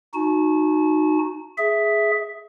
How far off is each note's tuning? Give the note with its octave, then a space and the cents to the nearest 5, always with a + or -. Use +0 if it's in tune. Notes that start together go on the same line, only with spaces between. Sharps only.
D#4 -15 F#4 -20 A5 -45
G#4 +5 E5 +0